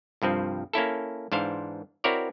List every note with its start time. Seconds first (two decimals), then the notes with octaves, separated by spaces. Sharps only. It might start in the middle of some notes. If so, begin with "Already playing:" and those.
0.22 C2 G2 F3 C4
0.73 A#3 C#4 E4 A4
1.32 G#2 E3 D4 C5 F5
2.04 C4 E4 F#4 A#4 C#5 D5